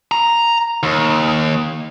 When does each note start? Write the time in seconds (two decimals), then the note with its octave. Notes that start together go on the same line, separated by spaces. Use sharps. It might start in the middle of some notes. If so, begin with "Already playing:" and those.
0.11 A#5
0.83 D#2